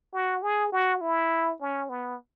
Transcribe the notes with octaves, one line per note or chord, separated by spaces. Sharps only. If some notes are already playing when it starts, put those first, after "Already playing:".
F#4
G#4
F#4
E4
C#4
B3